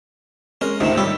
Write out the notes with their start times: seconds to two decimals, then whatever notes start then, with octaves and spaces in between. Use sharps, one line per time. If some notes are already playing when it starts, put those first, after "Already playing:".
0.61 G#3 C#4 A#4
0.80 C#2 G#2 C3 D#3 A3
0.97 G3 G4 C#5 E6